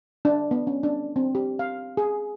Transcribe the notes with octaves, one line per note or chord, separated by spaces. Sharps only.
D4
B3
C#4
D4
C4
G4
F5
G#4